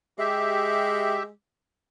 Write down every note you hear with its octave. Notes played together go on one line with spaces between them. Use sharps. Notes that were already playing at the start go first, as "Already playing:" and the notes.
G#3 G4 E5